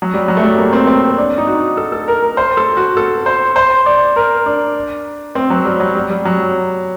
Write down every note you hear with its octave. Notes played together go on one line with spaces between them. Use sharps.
F#3
G3
F#3
A3
G3
A#3
C4
C4
D4
D#4
F#4
A4
A4
A#4
A#4
C5
A4
F#4
A4
C5
C5
D5
A#4
D4
C4
F#3
G3
F#3
G3
G3
F#3